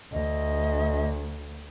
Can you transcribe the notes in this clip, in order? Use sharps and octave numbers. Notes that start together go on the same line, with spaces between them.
D2 D#5